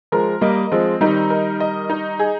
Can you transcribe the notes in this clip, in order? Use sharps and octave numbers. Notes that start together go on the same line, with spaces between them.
F3 G#3 A#4
G3 A#3 D#5
F3 G#3 C4
D#3 G3 D#4
A#4
D#5
D#4
G#4